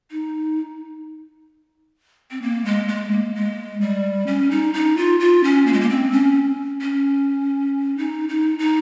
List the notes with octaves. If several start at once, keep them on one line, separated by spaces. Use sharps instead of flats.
D#4
C4
A#3
G#3
G#3
A#3
G#3
G3
C#4
D#4
D#4
F4
F4
C#4
A#3
G#3
A#3
C4
C#4
C#4
D#4
D#4
D#4